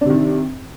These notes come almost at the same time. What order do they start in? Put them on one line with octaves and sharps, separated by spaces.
D4 C3 D#3